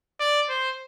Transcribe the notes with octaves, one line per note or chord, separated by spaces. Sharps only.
D5
C5